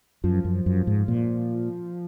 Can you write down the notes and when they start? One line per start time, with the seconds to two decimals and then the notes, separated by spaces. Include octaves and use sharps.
0.24 F#2 F3
0.45 F#2
0.66 F#2
0.87 G#2
1.08 A#2